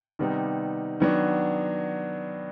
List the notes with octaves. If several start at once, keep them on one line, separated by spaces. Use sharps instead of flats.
C3 D#3 G3 B3 D#4
D#3 F#3 B3 D4